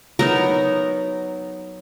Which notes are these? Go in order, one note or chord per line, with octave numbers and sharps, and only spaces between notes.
F#3 B3 D#4 A#4